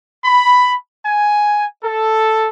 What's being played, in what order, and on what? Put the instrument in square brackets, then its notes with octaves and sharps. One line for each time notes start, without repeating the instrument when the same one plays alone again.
[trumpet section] B5
G#5
A4